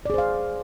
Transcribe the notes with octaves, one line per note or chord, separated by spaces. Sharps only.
G#4 C5 D5 F5